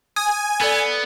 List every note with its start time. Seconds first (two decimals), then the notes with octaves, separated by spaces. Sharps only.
0.16 G#5 D#6
0.61 B3 A4 D5